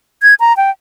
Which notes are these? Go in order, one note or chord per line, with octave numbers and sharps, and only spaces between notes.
G#6
A#5
G5